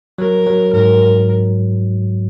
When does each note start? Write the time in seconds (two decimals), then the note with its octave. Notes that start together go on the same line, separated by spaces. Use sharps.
0.18 F#3 A#4
0.47 F#3
0.73 G#2 A#4